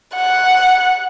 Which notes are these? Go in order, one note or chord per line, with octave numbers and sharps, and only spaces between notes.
F#5